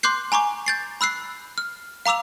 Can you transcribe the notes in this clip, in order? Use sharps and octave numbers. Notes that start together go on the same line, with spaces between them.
C6 D6 F#6 G6 C7
G#5 A#5 C#6 D6
G6 A6 C7
B5 E6 F#6 C7
F6
F5 A#5 D6 E6 F7